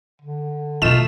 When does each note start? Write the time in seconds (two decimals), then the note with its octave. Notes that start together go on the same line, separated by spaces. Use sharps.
0.22 D3
0.82 B2 D#3 A3 D#4 F4 E7